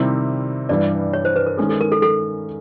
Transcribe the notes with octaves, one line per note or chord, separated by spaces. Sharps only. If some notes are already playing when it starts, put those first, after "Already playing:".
Already playing: C3 D#3 G3 C4 E4
G2 E3 G3 D5
C#5
C5
B4
A#4
D#3 G#3 C#4 A4
A4
A#4
A4
A4